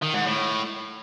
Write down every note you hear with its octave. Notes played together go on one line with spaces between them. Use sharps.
D#3
G#2
A2